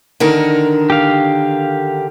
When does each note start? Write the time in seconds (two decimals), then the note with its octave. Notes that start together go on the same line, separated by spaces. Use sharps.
0.20 D3 D#3 A#4
0.90 G4 F5